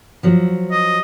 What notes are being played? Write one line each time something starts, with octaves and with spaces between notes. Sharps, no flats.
F3 F#3
D#5